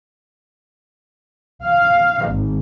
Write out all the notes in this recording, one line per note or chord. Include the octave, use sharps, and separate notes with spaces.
F5
G#1